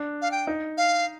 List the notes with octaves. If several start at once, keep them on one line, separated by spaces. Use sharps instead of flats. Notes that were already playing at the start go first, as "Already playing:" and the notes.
Already playing: D4
F5
G5
D#4
F5